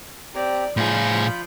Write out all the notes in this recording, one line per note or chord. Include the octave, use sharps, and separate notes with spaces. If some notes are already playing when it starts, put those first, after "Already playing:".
C4 G4 D5 A#5
A2 F3 F4 G#4 B5 G6